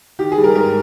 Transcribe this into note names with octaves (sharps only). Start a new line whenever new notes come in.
D#3 G4
G#4
G3
A#4
G#2 A#4